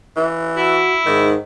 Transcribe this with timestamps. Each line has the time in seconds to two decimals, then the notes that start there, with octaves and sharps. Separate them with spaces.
0.16 E3
0.57 E4 F#4
1.06 G#2 D#3